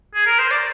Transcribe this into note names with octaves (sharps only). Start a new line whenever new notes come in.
G#4
A#4
C5
D5